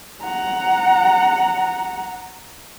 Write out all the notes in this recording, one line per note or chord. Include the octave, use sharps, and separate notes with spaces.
F#5 A#5